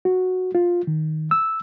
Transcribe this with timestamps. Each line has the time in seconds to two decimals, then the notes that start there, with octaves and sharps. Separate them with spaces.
0.05 F#4
0.55 F4
0.87 D#3
1.31 E6